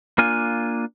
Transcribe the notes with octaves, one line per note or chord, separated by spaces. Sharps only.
A#3 D4 F4 G#5